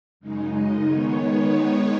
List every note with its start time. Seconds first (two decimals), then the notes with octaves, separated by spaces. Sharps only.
0.20 F#2 C#3 G#3 D#4
0.53 D#5
0.85 D#3 G#3 B3 D#4 C#5